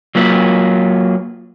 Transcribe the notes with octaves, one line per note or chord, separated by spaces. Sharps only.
F#3 A#3 F4 B4